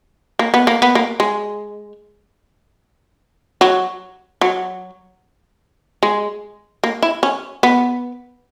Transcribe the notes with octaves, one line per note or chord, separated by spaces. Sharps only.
A#3
B3
A#3
B3
A#3
G#3
F#3
F#3
G#3
A#3
E4
C#4
B3